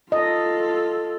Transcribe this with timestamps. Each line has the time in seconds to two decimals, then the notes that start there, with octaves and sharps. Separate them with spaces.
0.12 F4 A4 D#5